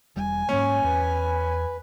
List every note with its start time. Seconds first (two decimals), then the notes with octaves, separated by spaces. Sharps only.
0.16 E1 G3 G#5
0.49 G#2 F#3 A#3 C#4 C#5
0.84 E2 B4